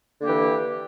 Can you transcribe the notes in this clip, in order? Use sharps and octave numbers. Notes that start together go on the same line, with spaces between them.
D3 E3 A#3 G4